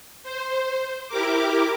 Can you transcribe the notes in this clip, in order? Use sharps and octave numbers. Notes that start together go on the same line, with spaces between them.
C5
E4 G4 A#4 D6